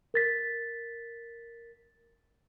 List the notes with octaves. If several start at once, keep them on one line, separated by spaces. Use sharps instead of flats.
A#4 A6 B6